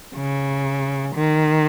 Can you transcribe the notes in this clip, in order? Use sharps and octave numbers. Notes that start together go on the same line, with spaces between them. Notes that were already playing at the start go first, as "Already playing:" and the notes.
C#3
D#3